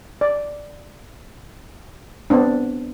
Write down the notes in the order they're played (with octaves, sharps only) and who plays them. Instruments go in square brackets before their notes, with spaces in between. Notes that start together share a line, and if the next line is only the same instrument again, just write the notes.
[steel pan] D5
B3 C4 D4